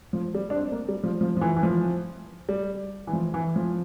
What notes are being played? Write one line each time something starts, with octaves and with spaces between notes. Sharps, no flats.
F3
G3
D4
C4
A#3
G3
F3
F3
F3
E3
E3
F3
G3
E3
F3
E3
F3